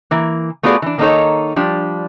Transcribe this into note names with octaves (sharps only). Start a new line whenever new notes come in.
E3 A#3
A3 B3 F4 F#4 G#4 D5
E3 D4
D#3 A#3 D4 D#4 A4 C#5
F3 G3 D4